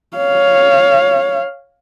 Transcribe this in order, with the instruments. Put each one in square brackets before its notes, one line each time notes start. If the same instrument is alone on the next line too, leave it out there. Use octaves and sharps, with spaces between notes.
[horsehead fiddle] C#5 F5